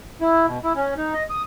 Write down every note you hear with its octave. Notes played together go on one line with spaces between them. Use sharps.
E4
B2
E4
C#4
D#4
D#5
D#6